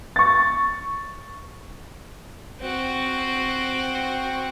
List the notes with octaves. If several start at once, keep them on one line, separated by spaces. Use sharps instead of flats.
C#6 A6
C4 F#4